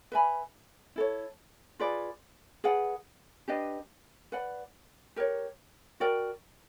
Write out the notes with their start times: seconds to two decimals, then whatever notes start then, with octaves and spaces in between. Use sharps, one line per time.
0.12 B4 E5 G#5 B5
0.96 E4 A4 C#5
1.79 F4 G#4 B4 D5
2.64 G#4 B4 D5 F#5
3.48 D4 G4 B4 D#5
4.32 B4 D5 F#5
5.16 G4 A#4 C#5
6.00 F#4 A#4 D5 G5